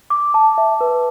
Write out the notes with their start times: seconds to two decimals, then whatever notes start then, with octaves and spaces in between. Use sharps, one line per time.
0.10 D6
0.34 A5
0.58 E5
0.81 B4